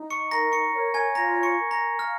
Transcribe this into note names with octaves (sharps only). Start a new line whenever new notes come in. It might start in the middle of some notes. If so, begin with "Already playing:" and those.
Already playing: D#4
C#6 C#7
A#4 A#5 A#6
C#6 C#7
C#5
G#5 G#6
F4 A#5 A#6
C#6 C#7
A#4
A#5 A#6
F5 F6